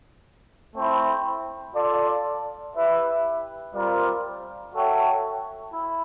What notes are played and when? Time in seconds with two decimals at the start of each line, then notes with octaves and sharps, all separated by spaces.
0.75 A3 C4 E4
1.75 F4 A4 D5
2.75 E4 G4 B4 E5
3.74 G3 C4 F4 A#4 D5
4.74 F#4 A4 C#5 E5 G5
5.73 E4